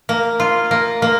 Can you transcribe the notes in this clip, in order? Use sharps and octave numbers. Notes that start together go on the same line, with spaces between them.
A#3
F4
A#3
A#3